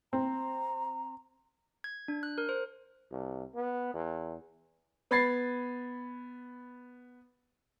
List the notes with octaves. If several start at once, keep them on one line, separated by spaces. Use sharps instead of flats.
C4 A#5
G#6
D4
F#6
A#4
C5
C2
B3
E2
B3 B5 G#6 A6 C7